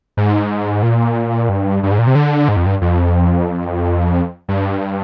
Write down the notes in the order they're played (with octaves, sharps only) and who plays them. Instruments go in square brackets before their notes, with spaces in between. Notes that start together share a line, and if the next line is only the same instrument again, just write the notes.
[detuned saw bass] G#2
A#2
G2
G2
G#2
A#2
C3
D3
G#2
F2
G2
F2
G2